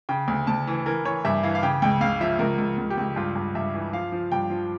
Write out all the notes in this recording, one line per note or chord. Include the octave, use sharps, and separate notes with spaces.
C#3 G5
D2
D2 A5
E3
E3 A#4
E3 C#5
G2 E5
E3 F5
F5
C#3 G5
C#2 G5
C#2 F5
F3 E5
C#2 A#4
C#2
C#2
G4
C#2
G2 F4
G2
G2 E5
E3
F3 F5
F3
G2 G5
F3